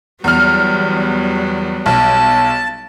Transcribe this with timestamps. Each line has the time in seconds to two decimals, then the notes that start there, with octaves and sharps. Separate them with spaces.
0.24 E2 F#3 G3 B3 F6
1.86 B1 A5